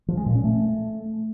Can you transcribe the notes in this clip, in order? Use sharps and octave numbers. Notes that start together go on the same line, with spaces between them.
F3
G#3
A#2
C#4
A3